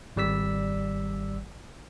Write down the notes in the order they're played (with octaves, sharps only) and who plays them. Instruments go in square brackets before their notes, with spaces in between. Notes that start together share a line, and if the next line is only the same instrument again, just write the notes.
[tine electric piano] G#1 G3 D5 E6 B6